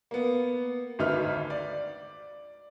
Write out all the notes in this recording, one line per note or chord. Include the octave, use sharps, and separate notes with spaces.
A#3 B3
G#1 D2 D#4 B4 E5 F6
D5